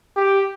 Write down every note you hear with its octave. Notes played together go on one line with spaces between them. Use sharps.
G4